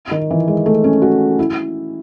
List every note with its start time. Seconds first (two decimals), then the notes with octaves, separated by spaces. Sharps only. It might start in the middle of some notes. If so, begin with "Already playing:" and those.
0.11 D#3
0.30 E3
0.48 G#3
0.66 A3
0.84 C#4
1.02 F#4
1.39 E4